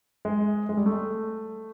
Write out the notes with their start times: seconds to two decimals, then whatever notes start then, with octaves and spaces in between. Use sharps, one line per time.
0.25 G#3
0.69 G#3
0.77 G3
0.86 A3